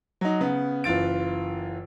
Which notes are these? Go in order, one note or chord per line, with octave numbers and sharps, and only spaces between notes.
F#3 D#4
C#3 B3
F#1 E3 F4 A6 D7